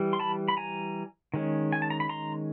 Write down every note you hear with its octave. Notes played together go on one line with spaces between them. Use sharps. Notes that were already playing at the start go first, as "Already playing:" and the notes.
Already playing: E3 G3
C6
A5 B5
B5
G#5 A#5
D#3 G#3 C#4
G#5
A5
A#5
B5
A#5 C6